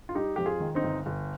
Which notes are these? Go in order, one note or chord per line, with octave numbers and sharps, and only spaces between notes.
F4
G3 D#4 G4
F2 G4
F4 G#4
D#3
C4 D#4
G1
G1